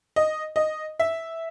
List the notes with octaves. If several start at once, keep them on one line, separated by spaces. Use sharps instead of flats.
D#5
D#5
E5